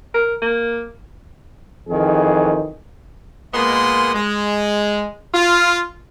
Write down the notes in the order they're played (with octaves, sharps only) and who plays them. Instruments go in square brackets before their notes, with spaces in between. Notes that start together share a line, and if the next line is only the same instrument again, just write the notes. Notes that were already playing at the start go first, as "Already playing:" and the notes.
[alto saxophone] A#4
A#3
[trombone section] F2 D#3 E3 G#4
[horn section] A#2 G#3 A#3 B3 D#5 C6
G#3
F4